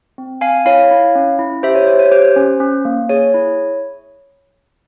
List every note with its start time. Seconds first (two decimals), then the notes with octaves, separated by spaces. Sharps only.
0.18 C4
0.41 C4 F5 G#5
0.66 E4 C#5 F5
0.91 E4
1.15 C#4
1.39 E4
1.63 G4 C5 E5
1.75 C#5
1.87 G4 C5
1.99 C#5
2.11 G4 C5
2.36 C#4
2.60 C#4
2.85 A#3
3.09 G#4 C#5
3.34 E4